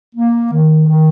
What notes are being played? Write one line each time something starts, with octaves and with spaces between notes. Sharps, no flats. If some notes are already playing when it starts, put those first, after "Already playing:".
A#3
D#3
D#3